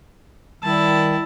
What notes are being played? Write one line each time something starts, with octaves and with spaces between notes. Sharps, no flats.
D#3 G3 E4 A5